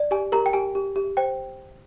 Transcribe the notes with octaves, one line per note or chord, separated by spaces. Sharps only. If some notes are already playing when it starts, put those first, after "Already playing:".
Already playing: D5
G4 G#5
G4 A#4 A#5
G5
G4 G#5
G4
G4
C5 G5